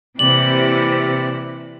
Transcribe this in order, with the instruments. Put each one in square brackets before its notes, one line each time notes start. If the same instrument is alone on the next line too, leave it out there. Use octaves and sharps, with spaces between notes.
[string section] C3 [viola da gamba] E3 A#3 E4 [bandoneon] G4 D5 [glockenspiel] F#7